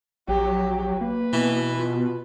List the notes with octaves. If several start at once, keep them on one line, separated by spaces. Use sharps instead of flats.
A#1 F#3 G4
A#3 B4
B2 E3
F4